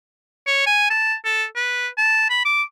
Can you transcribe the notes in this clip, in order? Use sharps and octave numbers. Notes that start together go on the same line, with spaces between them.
C#5
G#5
A5
A4
B4
A5
B5
D6